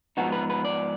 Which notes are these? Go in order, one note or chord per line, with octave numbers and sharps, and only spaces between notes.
G#2 F3 B3 D#4 F#4
B4
B4
D5